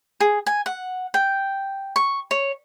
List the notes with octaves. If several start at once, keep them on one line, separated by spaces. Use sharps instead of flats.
G#4
G#5
F#5
G5
C#6
C#5